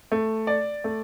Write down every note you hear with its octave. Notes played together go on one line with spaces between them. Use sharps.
A3
D5
A3